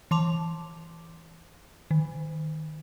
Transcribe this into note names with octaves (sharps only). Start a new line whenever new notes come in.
E3 A5 C6 D6 F7
D#3